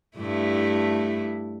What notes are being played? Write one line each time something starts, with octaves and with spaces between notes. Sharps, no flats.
G2 A3 E4